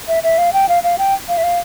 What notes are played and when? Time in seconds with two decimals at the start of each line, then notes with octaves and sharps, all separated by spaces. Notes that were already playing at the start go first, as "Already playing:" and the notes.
0.08 E5
0.23 E5
0.38 F5
0.53 G5
0.69 F5
0.83 F5
0.98 G5
1.28 F5
1.37 E5
1.43 F5